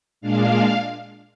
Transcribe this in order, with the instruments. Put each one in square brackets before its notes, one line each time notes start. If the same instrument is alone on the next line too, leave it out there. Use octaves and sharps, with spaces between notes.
[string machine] A#2 G#3 D4 F5